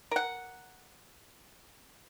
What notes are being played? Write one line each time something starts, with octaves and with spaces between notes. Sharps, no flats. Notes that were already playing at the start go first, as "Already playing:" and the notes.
A#4 F#5